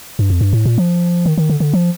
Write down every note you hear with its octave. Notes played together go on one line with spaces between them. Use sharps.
G2
F2
G2
A2
A#2
F3
D#3
D#3
D3
D3
F3